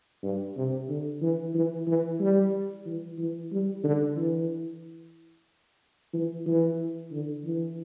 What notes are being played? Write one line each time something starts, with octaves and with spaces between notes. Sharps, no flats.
G2
C3
D3
E3
E3
E3
G3
E3
E3
G3
D3
E3
E3
E3
D3
E3